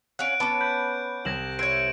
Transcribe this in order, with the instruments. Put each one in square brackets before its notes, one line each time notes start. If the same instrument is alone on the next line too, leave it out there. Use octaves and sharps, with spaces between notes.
[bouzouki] C#4 F5 F#5 [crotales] F#6 D7
[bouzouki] B3 C#4 [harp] A5 D6
[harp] B5 [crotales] G6
[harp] C2 G#6 [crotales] A#6 E7 F#7
[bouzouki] E4 C#5 [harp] C5 G#6 [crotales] D7